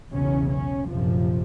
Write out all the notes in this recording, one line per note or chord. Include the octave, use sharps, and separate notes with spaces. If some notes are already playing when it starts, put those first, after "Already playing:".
B1 E2 C#3 C#4
C#4
A#1 F#2 C3 F3